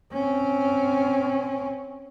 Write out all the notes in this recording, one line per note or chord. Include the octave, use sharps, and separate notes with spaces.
C4 C#4